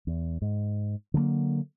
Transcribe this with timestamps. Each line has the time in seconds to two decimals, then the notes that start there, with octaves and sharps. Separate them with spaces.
0.07 E2
0.42 G#2
1.14 D3 F#3 G#3 A#3